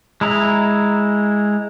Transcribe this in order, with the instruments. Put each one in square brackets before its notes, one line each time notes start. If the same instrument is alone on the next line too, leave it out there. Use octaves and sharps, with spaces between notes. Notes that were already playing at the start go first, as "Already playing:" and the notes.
[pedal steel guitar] G#3 E4 A#5